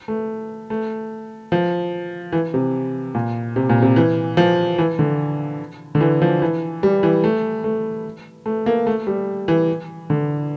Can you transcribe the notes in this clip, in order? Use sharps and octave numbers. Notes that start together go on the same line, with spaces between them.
A3
A3
F3
E3
C3
A#2
C3
A#2
C3
E3
F3
E3
D3
D3
E3
F3
E3
G3
E3
A3
A3
A3
A#3
A3
G3
E3
D3